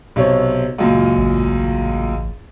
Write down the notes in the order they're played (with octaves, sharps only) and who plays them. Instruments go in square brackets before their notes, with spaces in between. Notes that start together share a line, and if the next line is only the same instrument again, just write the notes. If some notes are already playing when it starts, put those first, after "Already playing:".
[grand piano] B1 C3 C#5
C#2 F#2 A#2
[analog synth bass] A1